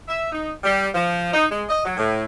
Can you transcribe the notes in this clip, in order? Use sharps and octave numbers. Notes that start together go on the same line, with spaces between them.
E5
D#4
G3
F3
D#4
G#3
D#5
F#3
A2